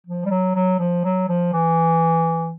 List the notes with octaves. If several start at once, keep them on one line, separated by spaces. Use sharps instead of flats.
F3
G3
F#3
F#3
F3
F#3
F3
E3